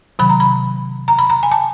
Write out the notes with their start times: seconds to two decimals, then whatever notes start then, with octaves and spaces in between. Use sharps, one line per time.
0.19 C3 D#3 F#3 B5
0.29 A#5
0.40 B5
1.08 A#5
1.19 B5
1.30 A#5
1.43 G#5
1.52 A5